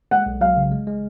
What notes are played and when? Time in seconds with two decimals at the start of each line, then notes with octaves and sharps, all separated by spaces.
0.11 G#3 F#5
0.26 B1
0.41 F#3 F5
0.57 C#3
0.72 G#3
0.87 G#3